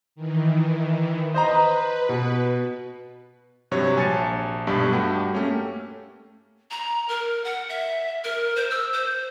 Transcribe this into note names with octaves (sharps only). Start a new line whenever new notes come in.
D#3 E3
B4 C5 D#5 A#5
B2
G2 C3 F#3 C#5
A#1 G#5 A5 A6 C#7
B1 G2 G3
G2 A3 F#4 G4
A3 A#3 C#4 G4
A#5
A#4
F#5
E5
A#4
C5
E6
C5